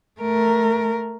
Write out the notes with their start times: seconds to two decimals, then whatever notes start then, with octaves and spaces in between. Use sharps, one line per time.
0.21 A3 A#4